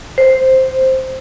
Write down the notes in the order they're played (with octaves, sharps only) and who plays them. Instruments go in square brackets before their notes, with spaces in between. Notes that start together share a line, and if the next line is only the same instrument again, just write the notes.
[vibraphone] C5